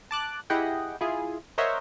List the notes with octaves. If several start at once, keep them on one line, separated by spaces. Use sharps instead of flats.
A5 D6 F#6
E4 G4 G#4 D#5 F#5 G5
E4 F4 G#4
A#4 C5 C#5 D#5 E5 F#5